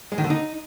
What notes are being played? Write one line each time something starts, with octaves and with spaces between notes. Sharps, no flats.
G#3
D#3
D3
D#4